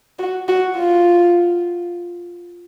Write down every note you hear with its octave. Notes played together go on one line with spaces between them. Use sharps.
F#4
F#4
F4